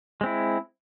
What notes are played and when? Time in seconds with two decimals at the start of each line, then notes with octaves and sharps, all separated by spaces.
0.21 G#3
0.24 C4
0.26 E4